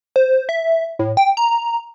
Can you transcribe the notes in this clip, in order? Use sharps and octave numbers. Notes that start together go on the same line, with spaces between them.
C5
E5
A2
G5
A#5